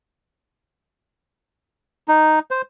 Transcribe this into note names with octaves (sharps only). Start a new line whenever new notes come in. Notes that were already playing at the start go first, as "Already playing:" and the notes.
D#4
C5